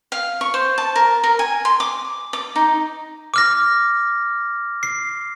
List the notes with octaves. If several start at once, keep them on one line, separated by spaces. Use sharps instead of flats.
F5
C#6
C5
A5
A#4
A#4
G#5
C6
D6
D6
D#4
D6 F6 A#6
C7